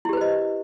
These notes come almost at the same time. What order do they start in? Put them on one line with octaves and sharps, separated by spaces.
E4 G4 B4 C5 D#5